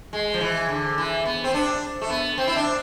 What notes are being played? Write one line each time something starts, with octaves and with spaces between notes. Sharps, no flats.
G#3
F3
E3
D3
E3
B3
C4
D4
A3
B3
C4
E4
D4